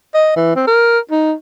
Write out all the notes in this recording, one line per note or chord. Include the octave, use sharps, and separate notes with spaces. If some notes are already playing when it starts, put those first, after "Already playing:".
D#5
E3
C4
A#4
D#4